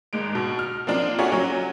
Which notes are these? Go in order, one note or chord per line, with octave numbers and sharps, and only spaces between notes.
G#1 G#3 D7
B2
F6
F3 A#3 C4 D4 F4
F#4 A4 C#5 D5 E5 G#5
F#3 C#4